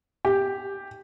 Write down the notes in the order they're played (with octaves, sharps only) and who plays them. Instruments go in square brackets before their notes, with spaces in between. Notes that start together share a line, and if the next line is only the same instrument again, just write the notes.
[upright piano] G4